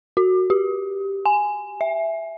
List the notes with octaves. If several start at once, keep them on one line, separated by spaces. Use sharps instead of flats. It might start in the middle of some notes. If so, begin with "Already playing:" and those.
F#4
G4
G#5
E5